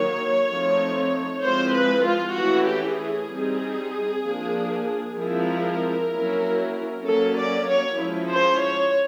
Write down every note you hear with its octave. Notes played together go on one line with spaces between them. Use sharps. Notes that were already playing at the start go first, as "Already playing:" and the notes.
Already playing: D#3 F#3 A#3 C#5
F3 A3 C4 D#4
F3 G#3 C4 E4 C5
B4
F4
E3 A3 C#4 E4 F#4
G4
G#4
G3 C4 D#4
F3 A#3 D4
F3 G#3 C4 E4 A#4
F#3 A#3 C#4 E4
F#3 A#3 C#4 A4
D5
C#5
F3 G#3 C#4 E4
C5
C#5